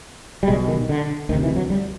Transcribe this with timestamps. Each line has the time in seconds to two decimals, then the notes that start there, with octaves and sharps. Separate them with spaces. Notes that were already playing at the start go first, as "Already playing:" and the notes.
0.43 G3
0.48 B1 B2 G#3
0.68 D#3
0.89 D3
1.29 D2 D#3
1.33 C3
1.43 E3
1.56 F#3
1.70 G3